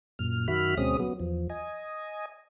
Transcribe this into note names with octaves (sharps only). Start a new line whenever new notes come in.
F#2 A#2 F6
F#2 D#3 F#4 E5 B5 F6
D2 B2 G#3 C4 C#4 D#6
F#3 B3
E2 F3
D#5 G#5